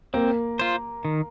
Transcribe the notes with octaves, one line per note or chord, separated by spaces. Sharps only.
A#3 C4
F4 C5
D#3